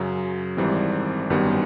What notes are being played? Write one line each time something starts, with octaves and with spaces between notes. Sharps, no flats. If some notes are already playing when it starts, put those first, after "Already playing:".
Already playing: F#2 C#3 F#3
G#1 G#2 E3 G3 C4
G1 F#2 D#3 G3 B3